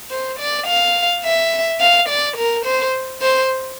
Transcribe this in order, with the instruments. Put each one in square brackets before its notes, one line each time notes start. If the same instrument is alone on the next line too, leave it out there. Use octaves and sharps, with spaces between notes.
[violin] C5
D5
F5
E5
F5
D5
A#4
C5
C5